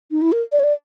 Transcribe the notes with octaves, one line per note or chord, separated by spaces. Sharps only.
D#4
E4
A#4
D5
C#5
D5